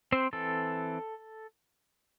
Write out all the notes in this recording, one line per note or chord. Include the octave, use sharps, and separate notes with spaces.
C4 C5
E3 C4 A4